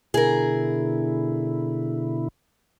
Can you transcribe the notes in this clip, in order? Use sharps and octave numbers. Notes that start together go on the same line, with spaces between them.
B2 D3 E4 G#4 A#4